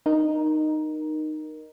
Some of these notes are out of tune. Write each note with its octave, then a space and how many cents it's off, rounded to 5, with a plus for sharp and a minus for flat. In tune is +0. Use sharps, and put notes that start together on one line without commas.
D#4 -15 A#4 +10